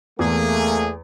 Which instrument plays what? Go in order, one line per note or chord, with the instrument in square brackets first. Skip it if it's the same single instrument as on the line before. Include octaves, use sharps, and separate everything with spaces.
[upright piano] E2 [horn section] A3 A#3 G#4